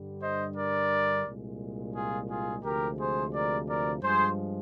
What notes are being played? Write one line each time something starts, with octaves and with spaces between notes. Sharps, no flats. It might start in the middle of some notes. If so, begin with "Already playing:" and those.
Already playing: G2 D3 G3
C5 D#5
A#4 D5
C2 A#2 G#3
F4 G#4
F4 G#4
D2 C3 F3 G#3 G4 A#4
G#4 C5
A#4 D5
A#4 D5
G2 F3 G#3 G#4 C5